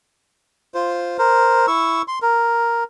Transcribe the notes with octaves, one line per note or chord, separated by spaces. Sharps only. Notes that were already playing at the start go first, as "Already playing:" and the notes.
F4 C5
A#4 C5
E4 C#6 E6
C6
A#4